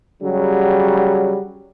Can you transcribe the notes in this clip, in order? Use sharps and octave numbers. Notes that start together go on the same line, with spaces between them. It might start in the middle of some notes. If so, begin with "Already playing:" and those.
C#3 F#3 G3